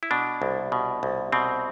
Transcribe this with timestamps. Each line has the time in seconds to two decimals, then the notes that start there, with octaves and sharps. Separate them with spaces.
0.03 E4
0.11 B2 D4
0.42 C2
0.72 B2
1.03 C2
1.32 B2 C4